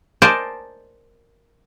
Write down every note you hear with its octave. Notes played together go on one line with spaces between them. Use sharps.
A#4 C5 D5 D#5 G#5 A5